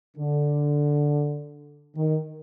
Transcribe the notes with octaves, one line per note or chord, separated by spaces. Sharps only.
D3
D#3